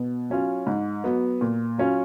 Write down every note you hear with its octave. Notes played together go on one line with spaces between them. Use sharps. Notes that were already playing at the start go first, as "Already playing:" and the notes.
Already playing: B2
F#3 C#4 F4
G#2
F#3 B3
A#2
F#3 C#4 F4